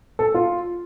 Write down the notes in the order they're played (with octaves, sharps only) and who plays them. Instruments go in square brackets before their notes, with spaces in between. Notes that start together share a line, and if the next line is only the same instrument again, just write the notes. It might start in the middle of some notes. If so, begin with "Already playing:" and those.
[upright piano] A4
F4